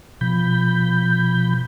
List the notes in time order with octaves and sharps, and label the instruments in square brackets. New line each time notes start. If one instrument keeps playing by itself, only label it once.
[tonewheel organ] B2 F3 B5 G6